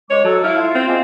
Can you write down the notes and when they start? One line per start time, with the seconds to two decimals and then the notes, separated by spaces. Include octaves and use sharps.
0.10 C#2 G#3 C#5 D6
0.24 F#3 A4
0.44 E4 F5 F6
0.58 F4
0.75 C4
0.87 G#3 A#3 F4